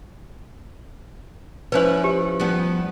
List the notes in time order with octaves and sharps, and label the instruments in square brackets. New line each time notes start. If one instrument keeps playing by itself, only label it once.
[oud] F3 C#4 E4 [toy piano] B4 C5
[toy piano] G4
[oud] F3 G3 B3